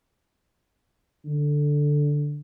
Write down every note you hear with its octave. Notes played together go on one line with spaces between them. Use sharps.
D3